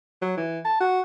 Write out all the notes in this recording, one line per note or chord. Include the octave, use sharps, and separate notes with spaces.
F#3
E3
A5
F#4